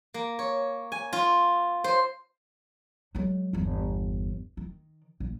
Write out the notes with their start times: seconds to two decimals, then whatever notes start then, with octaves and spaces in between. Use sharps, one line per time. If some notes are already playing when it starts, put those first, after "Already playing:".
0.14 A#3
0.39 C#5
0.92 G#5
1.13 F4
1.84 C5
3.15 F#3 G#3
3.53 G1 E2
4.57 D#3
5.20 A#1